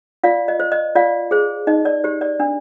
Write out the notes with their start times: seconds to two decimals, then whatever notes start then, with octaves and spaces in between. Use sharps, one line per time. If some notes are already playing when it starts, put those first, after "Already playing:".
0.24 F4 D5 F5
0.48 D#5
0.60 C5
0.72 D#5
0.95 F4 D5 F5
1.31 G#4 C5
1.67 D#4 D#5
1.85 D5
2.04 G4 C5
2.21 D5
2.40 D4